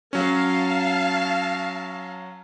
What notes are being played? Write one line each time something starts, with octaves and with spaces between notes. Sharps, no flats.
F#3 C#4 F5 A5